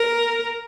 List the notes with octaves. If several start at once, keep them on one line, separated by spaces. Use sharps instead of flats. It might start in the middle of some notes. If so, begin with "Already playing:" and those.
Already playing: A#4